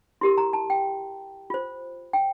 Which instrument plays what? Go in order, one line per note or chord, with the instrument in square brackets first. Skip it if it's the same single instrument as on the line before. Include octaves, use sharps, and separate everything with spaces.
[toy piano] E4 G4 A#4 C6
A#5
A5
G5
F4 C5
G5